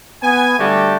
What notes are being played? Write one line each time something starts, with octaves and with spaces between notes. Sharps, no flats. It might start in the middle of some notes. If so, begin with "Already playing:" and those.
B3 G#5
D3 G3 A3 F#4 G4 A5